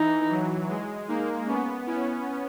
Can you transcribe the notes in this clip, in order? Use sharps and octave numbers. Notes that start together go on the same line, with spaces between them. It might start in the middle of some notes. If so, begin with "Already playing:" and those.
Already playing: E3 D#4
F#3
G#3
A#3 D#4
B3 C#4
C#4 E4